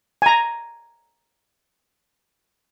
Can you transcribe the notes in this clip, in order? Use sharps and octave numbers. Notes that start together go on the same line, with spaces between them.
G#5 A#5